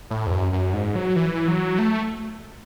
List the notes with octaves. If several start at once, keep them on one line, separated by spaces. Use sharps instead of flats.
A2
E2
F#2
F#2
G#2
F#3
E3
F#3
A3